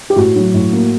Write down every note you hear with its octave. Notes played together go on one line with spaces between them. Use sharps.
G4
A2 F#4
F#3
A2
A#3